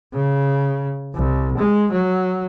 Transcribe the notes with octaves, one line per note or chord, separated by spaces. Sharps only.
C#3
C2
G#3
F#3